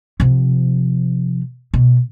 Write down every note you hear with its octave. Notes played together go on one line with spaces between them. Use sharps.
C3 F3
B2